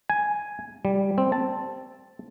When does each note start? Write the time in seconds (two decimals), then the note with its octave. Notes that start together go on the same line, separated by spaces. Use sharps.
0.10 G#5
0.85 G3
1.18 C4
1.32 A5